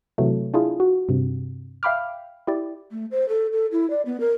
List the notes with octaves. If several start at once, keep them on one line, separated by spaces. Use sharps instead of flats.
C3 E3 F#3 A3
D4 E4 F4 G#4
F#4
G2 C3
E5 F5 G5 B5 D6 F6
E4 G4 D5
A3
C5
A4
A4
E4
D5
B3
A#4